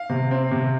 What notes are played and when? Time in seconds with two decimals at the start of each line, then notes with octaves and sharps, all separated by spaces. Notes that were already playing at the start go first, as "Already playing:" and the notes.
Already playing: F5
0.09 C3
0.31 C4
0.51 C3